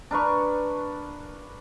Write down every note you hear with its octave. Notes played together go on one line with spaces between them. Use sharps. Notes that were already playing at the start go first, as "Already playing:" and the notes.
D4 A#4 B4 C#6